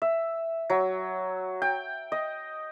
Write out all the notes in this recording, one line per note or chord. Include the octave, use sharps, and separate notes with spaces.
E5
F#3
G5
D#5